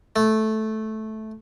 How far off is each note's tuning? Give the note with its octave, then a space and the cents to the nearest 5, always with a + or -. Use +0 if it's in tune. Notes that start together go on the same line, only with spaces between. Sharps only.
A3 -10